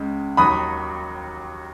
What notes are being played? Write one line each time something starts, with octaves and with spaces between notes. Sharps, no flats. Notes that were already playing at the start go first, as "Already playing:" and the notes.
Already playing: C#2 C#3 G#3
D#2 D#3 F#3 B5 D#6